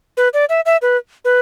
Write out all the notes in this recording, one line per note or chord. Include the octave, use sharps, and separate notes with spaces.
B4
D5
E5
E5
B4
B4